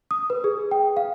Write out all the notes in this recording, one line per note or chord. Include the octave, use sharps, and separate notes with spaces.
D#6
B4
G#4
G5
F5